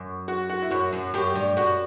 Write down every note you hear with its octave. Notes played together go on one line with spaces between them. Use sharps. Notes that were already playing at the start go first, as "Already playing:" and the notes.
Already playing: F#2
F#4
F#4
E4
F#2 F#4
F#2
F#2 G4
G2
F#2 F#4